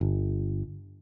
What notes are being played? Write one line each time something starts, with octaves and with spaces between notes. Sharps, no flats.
G1